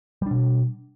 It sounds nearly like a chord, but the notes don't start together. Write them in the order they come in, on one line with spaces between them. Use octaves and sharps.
G3 D4 B2